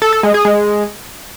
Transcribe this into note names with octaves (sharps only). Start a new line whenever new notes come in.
A4
A4
G#3
G#4
G#3